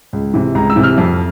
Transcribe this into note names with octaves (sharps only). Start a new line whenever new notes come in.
C#2
C3 E3
C#2 A#5
E6
C3 E3
F6
F2